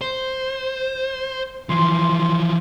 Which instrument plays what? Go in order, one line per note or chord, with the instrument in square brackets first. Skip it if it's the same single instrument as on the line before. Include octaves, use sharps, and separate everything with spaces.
[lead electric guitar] C5
[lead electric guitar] E3 F3 [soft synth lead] C6